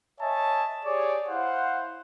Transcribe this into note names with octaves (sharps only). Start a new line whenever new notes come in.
C#5 D#5 E5 G#5 A5
G4 G#4 C#5 D5
E4 C5 F5 F#5